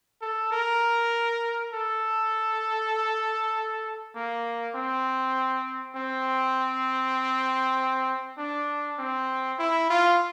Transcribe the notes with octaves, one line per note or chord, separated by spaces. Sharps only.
A4
A#4
A4
A#3
C4
C4
D4
C4
E4
F4